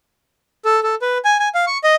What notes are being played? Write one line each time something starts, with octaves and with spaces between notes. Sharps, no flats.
A4
A4
B4
G#5
G#5
F5
C#6
D#5